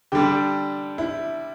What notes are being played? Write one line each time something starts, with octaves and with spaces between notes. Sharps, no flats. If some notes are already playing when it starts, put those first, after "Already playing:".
D3 G3 D4 G4
E4